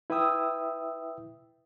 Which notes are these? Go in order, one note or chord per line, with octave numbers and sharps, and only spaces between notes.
E4 B4 E5 G5 D#6 E6